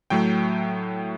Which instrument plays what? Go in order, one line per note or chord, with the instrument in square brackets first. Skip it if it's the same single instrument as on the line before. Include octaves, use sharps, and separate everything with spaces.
[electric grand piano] A2 F#3 A3 G5